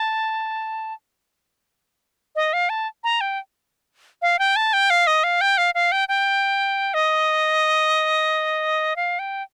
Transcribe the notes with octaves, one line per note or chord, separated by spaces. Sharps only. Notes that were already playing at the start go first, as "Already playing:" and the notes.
Already playing: A5
D#5
F5
A5
A#5
G5
F5
G5
A5
G5
F5
D#5
F5
G5
F5
F5
G5
G5
D#5
F5
G5